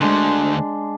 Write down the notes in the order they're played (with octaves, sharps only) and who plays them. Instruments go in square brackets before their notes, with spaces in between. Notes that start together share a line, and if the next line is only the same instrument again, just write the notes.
[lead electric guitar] D2 D3 [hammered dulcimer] G#3 D4 C6